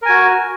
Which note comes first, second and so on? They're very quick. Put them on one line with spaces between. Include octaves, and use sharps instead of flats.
A#4 G#5 F#4